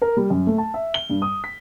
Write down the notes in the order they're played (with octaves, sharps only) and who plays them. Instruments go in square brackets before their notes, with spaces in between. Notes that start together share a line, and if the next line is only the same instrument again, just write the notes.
[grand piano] A#4
G3
F#2
A3
A5
E5
G7
G2
D#6
B6